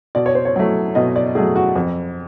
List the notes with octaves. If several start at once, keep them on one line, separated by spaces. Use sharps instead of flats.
B2 D5
C#5
C5
C#5
F#3 A3
B2 D#5
D5
F#3 A3 G#4
F#4
F2